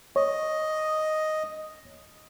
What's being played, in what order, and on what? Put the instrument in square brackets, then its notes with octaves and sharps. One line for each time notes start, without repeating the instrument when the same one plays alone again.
[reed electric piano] C#5 [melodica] D#5